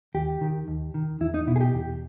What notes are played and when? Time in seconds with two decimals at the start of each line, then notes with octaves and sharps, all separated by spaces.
0.14 D#2 G4
0.41 D#3
0.68 D#2
0.94 D#3
1.21 E2 E4
1.34 D#4
1.47 B2 E4
1.56 G#4
1.61 G4
1.74 E2